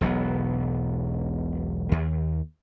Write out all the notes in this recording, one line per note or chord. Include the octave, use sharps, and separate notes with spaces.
E1 B1 F#3 B3
D#2